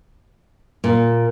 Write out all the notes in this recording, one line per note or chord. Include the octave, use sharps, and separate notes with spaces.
A#2